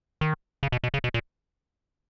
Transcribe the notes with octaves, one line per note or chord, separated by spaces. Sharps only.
D#3
C#3
B2
B2
C#3
B2
A#2